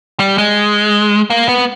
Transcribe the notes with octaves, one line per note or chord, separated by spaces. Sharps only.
G3
G#3
A#3
B3